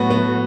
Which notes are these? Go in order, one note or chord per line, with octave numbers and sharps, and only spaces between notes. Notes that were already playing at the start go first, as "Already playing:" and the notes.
Already playing: A2 F#3 A3 B3 F#4
B3